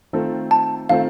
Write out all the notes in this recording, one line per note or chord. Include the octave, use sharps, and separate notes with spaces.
D#3 A3 C4 F4 A4
A5
D#3 A3 C4 F4 A4 F5